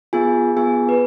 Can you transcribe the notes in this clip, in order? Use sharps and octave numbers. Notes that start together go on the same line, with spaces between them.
B3 F4 G#4 G#5
B3 F4 G#4 G#5
B4